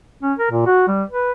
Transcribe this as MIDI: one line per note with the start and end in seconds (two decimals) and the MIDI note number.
0.23 0.33 61
0.39 0.51 70
0.52 0.66 46
0.67 0.84 66
0.88 1.03 55
1.10 1.32 71